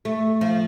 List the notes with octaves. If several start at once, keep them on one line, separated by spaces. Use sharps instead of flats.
A3
F3